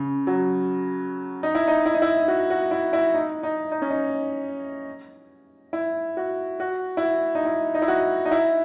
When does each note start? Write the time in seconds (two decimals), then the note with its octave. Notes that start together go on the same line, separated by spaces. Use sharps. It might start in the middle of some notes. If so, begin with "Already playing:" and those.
Already playing: C#3
0.27 F#3
1.43 D#4
1.55 E4
1.68 D#4
1.86 E4
1.95 D#4
2.02 E4
2.28 F#4
2.50 F#4
2.71 E4
2.93 E4
3.14 D#4
3.43 D#4
3.72 D#4
3.82 C#4
3.90 D#4
5.73 E4
6.17 F#4
6.60 F#4
6.97 E4
7.03 F#4
7.35 D#4
7.45 E4
7.74 D#4
7.82 E4
7.88 F#4
8.25 D#4
8.31 E4